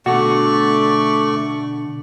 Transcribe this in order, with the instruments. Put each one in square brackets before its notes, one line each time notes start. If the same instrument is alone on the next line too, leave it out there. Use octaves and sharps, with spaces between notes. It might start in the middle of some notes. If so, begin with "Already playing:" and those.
[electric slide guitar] B2 D3 [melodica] A3 D5 C#6 [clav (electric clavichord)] F#4